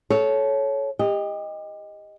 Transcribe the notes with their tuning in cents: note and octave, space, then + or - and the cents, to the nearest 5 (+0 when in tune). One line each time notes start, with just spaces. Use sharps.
A4 -25 C#5 +0
G4 +30 D#5 +0